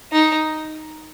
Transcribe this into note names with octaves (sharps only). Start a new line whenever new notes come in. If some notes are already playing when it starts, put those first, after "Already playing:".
D#4